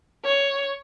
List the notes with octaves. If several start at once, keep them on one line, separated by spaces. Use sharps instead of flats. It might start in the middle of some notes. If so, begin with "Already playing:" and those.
C#5